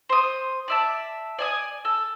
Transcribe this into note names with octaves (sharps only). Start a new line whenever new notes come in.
C5 D#6
D5 E5 A5
D5 G#5 D#6
A4